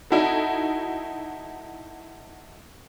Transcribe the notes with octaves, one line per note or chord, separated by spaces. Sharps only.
D#4 E4 F#4 A4